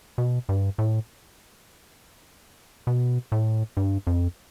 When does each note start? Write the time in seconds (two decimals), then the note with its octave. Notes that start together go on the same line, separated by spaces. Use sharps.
0.18 B2
0.49 G2
0.78 A2
2.87 B2
3.32 A2
3.77 G2
4.07 F2